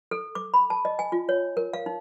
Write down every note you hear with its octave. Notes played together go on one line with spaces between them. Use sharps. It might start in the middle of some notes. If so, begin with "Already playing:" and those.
A4
D6
B5
A5
D#5
G#5
F4
C#5
A#4
F5
D#4